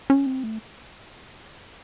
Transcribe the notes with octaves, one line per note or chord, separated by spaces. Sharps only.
C#4
C4
A3